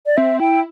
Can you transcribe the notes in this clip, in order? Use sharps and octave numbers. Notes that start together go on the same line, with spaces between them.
D5
C4 E5
E4 G5